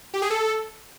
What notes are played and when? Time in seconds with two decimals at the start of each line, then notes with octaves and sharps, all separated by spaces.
0.14 G4
0.22 G#4
0.30 A4